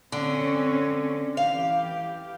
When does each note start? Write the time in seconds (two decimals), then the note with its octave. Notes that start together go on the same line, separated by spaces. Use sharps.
0.12 D3 C4 C#4
1.37 E3 G4 F5